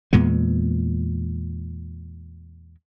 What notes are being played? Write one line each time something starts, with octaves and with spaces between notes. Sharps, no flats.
E2 A#2 G#3 B3